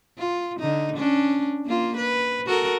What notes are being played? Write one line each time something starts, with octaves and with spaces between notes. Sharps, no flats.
F4
D3 D#4
C#4 D4
A#3 F4
B4
F#4 A4 A#4